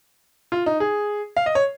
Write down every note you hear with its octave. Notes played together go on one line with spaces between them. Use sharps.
F4
D#4
G#4
F5
D#5
C#5